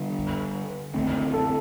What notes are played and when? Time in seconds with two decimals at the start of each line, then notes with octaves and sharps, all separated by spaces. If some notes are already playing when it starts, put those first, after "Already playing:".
Already playing: D3 G3 D4
0.94 D3 A3 C4
1.34 A4